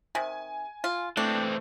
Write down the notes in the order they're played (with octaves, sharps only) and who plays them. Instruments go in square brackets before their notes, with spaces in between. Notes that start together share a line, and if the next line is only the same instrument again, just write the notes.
[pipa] C3 D#3 [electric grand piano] G#5
[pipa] F4
[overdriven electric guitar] E3 C4 [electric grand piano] A3 [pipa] D4